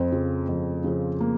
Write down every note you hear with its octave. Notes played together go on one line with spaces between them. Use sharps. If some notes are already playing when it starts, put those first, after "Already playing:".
Already playing: F2 C4
C#3 F3
F2
C#3 F3
A#3